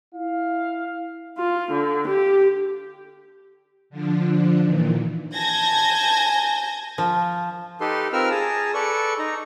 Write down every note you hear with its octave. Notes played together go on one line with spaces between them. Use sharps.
E4 F5
F4
D3
G4
D3 F3 D4
A#2 D#3 E3
G#5 A5 G6 G#6 A#6
F3
D#4 G4 A4 B4 C6
C4 F4 A#4 B4 E6 F6
G#4 A5 A#5
A4 B4 D5 C#6
D#4 A#5